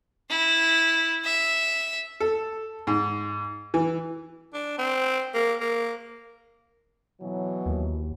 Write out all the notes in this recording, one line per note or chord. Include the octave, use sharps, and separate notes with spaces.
E4
E5
A4
G#2
E3
D4
C4
A#3
A#3
B2 E3 F#3
D#2